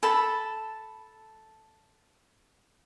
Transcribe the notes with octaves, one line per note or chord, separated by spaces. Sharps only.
A4 A5 B5